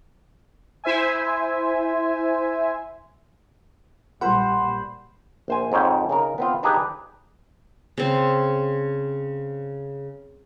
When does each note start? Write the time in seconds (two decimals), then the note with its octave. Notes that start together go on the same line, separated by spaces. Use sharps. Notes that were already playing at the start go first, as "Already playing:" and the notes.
0.84 E4 C5 E5 G#5
4.21 A#1 A#2 G3 B4 C5 F#5
5.48 A#1 C5 G#5
5.72 F2 G#2 C#5 G5
6.09 C#3 D#4 A#4
6.38 B3 C4 F4
6.63 D4 D#4 G4 G#4 B4
7.98 C#3 C4